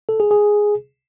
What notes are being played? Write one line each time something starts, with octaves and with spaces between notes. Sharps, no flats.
A4
G#4
G#4